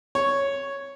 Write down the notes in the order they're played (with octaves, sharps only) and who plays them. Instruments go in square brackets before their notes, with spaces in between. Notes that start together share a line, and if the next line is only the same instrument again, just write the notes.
[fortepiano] C#5